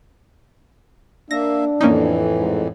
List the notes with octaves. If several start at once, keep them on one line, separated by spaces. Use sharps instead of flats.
A#3 D4 E5 A#6
F2 A2 E3 A#3 C#4 D#4
G#2